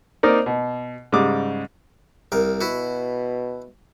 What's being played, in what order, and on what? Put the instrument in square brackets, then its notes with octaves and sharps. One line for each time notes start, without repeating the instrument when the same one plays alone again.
[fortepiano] A#3 C4 D#4 A#4 D5
B2
G#2 C#3 G3 D6 D#6
[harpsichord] C2 A#4
[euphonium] B2 [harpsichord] E4 F#4